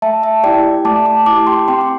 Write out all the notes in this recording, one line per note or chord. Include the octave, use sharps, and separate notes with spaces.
A3 E5 A5
E5 A5
E4 G4 D5 G5
A3 A5 D6
A5 D6
E4 G4 A5 D6
G5 C6
C4 G5 C6
C6